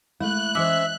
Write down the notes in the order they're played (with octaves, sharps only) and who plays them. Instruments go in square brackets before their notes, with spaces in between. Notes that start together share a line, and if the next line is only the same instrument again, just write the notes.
[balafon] G#3 [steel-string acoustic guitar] A3 E4 [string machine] F#6
[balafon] E3 D6 [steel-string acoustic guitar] C#4 C5 [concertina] E5